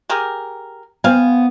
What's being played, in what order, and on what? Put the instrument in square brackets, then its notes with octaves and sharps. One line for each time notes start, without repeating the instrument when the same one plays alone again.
[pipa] G4 G#4 A#4
[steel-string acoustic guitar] B3 [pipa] C4 F5 G#5